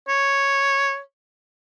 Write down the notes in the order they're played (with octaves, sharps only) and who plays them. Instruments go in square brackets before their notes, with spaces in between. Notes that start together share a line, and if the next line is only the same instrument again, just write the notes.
[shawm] C#5